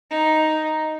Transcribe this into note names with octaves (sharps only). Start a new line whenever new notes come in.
D#4